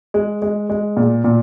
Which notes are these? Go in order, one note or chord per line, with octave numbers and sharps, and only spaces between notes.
G#3
G#3
G#3
A#2
A#2